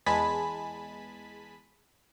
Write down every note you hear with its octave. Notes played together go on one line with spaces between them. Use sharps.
E2 G#3 G#5 A5 B5 B6